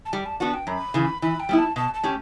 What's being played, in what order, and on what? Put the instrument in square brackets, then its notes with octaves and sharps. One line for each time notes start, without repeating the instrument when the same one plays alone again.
[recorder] A5
[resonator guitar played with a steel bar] G3 [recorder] G5
[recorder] A5
[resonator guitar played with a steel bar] B3 D4 F#4 [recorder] A5
[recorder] G5
[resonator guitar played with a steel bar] F#2 [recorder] B5
[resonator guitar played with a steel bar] C#3 E3
[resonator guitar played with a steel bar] E3 [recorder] B5
[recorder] G5
[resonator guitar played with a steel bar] G3 B3 E4
[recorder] A5
[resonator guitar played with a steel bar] B2 [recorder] A5
[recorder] A5
[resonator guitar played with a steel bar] A3 C#4 G4